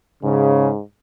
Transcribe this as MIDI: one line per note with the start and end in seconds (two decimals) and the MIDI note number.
0.23 0.81 44
0.23 0.69 49